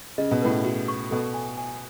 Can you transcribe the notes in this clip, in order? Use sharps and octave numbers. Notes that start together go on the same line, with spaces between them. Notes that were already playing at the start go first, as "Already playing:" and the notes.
C#3 D#5
B2
A2 C#3 B4
F#4
C#6
B2 A4
G#5
G#5